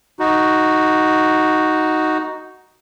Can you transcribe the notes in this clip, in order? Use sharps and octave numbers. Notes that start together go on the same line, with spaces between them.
D#4 F#4